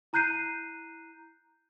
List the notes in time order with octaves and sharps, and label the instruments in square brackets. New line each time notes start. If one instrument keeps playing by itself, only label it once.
[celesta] E4 A#5 F#6 G6 C7 D#7